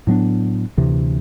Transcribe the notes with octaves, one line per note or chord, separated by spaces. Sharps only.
A2 F#3 B3 D4
D2 C3 E3